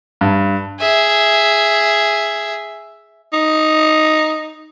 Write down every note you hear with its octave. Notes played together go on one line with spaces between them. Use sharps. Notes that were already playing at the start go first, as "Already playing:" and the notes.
G2
G#4 E5
D#4